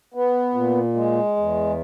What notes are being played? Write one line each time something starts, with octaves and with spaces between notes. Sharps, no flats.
B3
A#2
G#3
E2